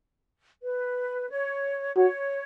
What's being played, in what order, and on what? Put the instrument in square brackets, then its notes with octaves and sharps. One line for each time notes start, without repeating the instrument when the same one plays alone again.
[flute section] B4
C#5
[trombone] F#4 [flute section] C#5